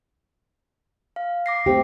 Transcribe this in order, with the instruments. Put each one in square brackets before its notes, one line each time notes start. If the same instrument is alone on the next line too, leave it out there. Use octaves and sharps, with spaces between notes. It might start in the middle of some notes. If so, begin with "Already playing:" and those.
[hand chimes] F5
D6 A#6 C7
[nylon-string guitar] A3 C4 G4